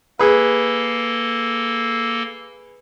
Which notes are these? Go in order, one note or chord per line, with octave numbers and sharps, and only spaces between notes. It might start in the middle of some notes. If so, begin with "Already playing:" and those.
A#3 G#4 A4 B4